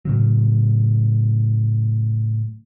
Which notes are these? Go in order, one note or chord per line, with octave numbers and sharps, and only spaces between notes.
A2 C#3 F#3